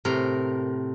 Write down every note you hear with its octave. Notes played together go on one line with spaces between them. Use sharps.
A2 C3 A#4